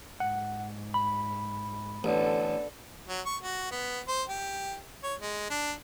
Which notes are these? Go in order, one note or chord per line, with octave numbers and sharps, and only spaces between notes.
G#2 F#5
B5
A1 D3 B3 A4
F#3
C#6
F#4
B3
C5
G4
C#5
G#3
D4